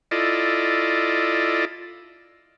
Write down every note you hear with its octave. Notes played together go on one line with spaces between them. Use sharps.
E4 F4 A4 D5 D#5